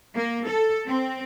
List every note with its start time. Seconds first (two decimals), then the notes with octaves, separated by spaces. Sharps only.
0.16 A#3
0.48 A4
0.87 C4